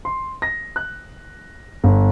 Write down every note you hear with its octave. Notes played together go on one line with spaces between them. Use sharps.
C6
A#6
F#6
G1